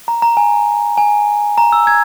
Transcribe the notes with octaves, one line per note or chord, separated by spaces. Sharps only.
A#5
A#5
G#5
G#5
A#5
E6
G#6